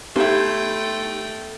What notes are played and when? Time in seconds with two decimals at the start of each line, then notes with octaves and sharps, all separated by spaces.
0.16 A3 B3 D#4 E4 G4 C5 G5